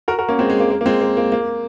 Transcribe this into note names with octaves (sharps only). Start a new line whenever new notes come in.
F#4 A#4
F#4 A#4
A#3 C#4
G#3 C4
G#3
A#3
A#3
A#3
G#3 C4
A#3
A#3
A#3